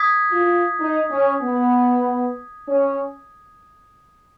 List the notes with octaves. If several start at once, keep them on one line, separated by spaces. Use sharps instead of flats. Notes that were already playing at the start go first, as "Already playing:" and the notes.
Already playing: D#6 G#6 B6
F4
D#4
C#4
B3
C#4